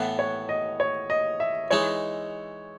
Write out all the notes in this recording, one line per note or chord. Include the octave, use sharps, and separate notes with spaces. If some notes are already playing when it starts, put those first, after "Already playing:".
Already playing: A2 E3 B3
C#5
D#5
C#5
D#5
E5
E3 G#3 D#4 C#5